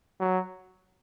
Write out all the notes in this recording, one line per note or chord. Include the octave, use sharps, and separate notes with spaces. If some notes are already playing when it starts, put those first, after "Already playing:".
F#3